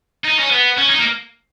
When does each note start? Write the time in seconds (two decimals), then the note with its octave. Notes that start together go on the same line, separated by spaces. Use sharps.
0.25 D#4
0.40 C#4
0.51 B3
0.77 C#4
0.90 D#4
0.99 A#3